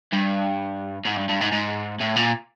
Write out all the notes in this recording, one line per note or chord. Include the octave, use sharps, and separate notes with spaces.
G2
G#2
G2
G2
G#2
G#2
A2
A#2